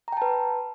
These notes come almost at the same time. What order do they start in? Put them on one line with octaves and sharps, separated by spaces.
A#5 G5 A5 B4